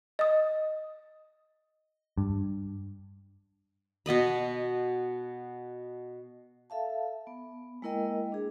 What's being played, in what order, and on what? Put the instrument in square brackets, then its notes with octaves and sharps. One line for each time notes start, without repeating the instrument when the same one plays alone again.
[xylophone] D#5 D#6
[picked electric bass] G2
[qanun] B2 B3 D#5 B5
[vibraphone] A4 E5 F5 A5
B3
G#3 A#3 E4 A#4 D#5 G5
D4 G#4